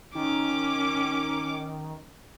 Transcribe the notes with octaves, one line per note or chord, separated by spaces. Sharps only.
D#3 C#4 D6